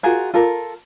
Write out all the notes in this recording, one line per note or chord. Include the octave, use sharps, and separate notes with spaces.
F4 F#4 G#4 A#4
F4 A4 A#4